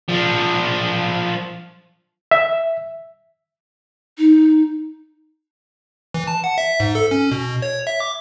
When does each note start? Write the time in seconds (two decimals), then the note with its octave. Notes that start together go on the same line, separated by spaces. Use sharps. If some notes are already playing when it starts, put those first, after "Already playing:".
0.09 F3 D4
2.31 E5
4.18 D#4
6.14 E3
6.27 A5
6.44 F#5
6.58 E5
6.80 G#2
6.95 A4
7.11 C#4
7.32 B2
7.62 C#5
7.87 E5
8.00 D6